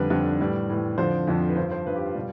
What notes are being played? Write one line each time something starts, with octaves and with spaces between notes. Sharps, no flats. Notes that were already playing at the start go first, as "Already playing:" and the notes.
Already playing: F2 D3 G3 B4
F2 D3 G3
A2 E3 G3
A2 E3 G3
F2 D3 F3 C5
F2 D3 F3
B4
G2 F3 C5
C5
G2 F3 B4
G4
F4
B2 G3